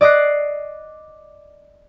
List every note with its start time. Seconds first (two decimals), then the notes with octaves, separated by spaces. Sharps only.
0.01 D5 D#5 D6 F#6 C7